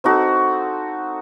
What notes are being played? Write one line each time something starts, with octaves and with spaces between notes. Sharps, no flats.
C4 D#4 F#4 A4